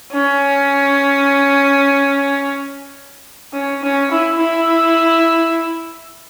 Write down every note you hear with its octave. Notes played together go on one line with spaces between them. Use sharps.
C#4
C#4
C#4
E4
E4